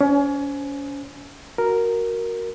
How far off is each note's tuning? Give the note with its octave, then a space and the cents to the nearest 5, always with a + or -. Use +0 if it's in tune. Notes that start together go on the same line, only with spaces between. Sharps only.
C#4 +35 C5 +0 G#5 +20
F#4 +5 A#4 +0